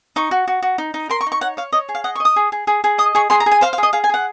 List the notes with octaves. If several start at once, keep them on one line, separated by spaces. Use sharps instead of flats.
D#4 C#6
F#4
F#4
F#4
D#4
D#4
A#4 C6
C#6
D#4
C#6
C#5 F#5
C#5 F5
C#5 D#5
G#4
F5
D#5 F#5
C#6
D#5 D#6
G#4
G#4
G#4
G#4
D#5 D#6
G#4 C#6
G#4 C6
A#5
G#4
G#5
C5 F5
F5
G#4 D#5
G#4 F5
G#5
G#4 F#5